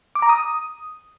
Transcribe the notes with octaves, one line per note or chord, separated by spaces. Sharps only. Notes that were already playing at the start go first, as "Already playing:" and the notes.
D6
A#5
D#6